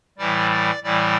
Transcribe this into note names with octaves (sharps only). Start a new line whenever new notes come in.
A2 E3 G3 D5
D5
A2 E3 G3 D5